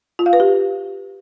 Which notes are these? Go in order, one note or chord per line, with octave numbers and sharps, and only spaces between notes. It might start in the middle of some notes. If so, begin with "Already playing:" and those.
F4
F5
B4
G4